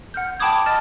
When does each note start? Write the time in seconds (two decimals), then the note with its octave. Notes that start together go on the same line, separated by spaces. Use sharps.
0.14 F#5 F6 G6
0.40 G5 A5 B5 D6 D#6 G#6
0.66 D#5 A5 F6 A6